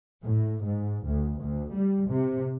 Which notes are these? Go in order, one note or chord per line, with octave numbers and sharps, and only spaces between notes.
A2
G#2
D2
D2
G3
C3